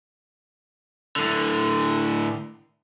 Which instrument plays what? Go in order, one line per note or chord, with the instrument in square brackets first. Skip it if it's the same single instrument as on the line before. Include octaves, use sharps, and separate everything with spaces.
[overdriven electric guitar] A2 D3